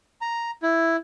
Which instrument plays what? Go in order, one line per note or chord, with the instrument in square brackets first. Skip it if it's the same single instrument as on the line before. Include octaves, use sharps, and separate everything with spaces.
[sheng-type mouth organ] A#5
E4